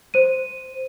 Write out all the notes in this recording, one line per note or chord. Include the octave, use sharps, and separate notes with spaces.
C5 D#7